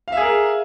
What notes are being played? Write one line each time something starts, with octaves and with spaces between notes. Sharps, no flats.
G#4 A#4 E5 F5